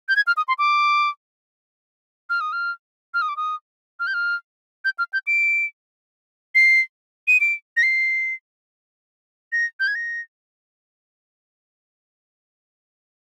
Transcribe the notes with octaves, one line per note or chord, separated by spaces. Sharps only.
G6
G#6
F6
D#6
C6
D6
F6
D#6
F6
F6
D#6
D6
D#6
F6
G6
F6
G6
F6
G6
D7
C7
D#7
D7
A#6
C7
A#6
G6
G#6
A#6